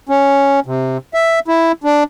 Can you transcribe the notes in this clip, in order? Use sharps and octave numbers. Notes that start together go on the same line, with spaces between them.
C#4
C3
E5
E4
D4